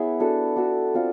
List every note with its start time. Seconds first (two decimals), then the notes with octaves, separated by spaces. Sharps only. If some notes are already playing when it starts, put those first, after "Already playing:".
Already playing: B3 E4 G#4 C#5 E5
0.20 D4 F#4 A4
0.56 D4 F#4 A4
0.94 C4 F4 A4 D5